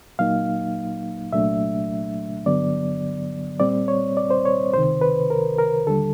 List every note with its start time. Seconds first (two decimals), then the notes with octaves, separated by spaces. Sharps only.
0.19 A#2 F#3 A#3 D#4 F5
1.33 C2 A#2 F#3 A3 D4 E5
2.46 G2 D3 F#3 B3 D5
3.60 A#2 G3 C4 D5
3.88 C#5
4.17 D5
4.30 C5
4.45 C#5
4.74 C#2 C3 D#3 C5
5.01 B4
5.30 A#4
5.59 A#4
5.87 D#2 D3 G3 A4